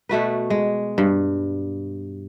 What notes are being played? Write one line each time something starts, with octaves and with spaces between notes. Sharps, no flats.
B2 A3 F#4 B4
G#3
G2